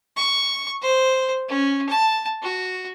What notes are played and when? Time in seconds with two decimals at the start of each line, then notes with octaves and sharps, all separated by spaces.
0.17 C#6
0.82 C5
1.49 C#4
1.89 A5
2.42 F#4